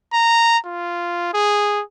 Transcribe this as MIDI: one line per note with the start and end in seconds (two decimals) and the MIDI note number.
0.13 0.58 82
0.66 1.31 65
1.34 1.82 68